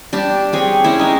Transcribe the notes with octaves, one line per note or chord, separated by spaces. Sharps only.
G3 D4 G4 A5
C4 G#4 C#5
C#4 E4
G#3 D#4